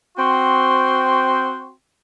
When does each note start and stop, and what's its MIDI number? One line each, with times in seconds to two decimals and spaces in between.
0.17 1.71 60
0.17 1.71 66
0.17 1.71 79
0.17 1.71 84